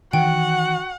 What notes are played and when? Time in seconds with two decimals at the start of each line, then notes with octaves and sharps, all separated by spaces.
0.13 D#3 E3 F#4 F#5 G5